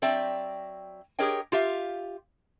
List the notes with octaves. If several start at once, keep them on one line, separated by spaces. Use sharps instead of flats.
F#3 C4 D5 E5 G5
G4 G#4 A#4 C#5 D#5 G5
F4 G4 E5 F5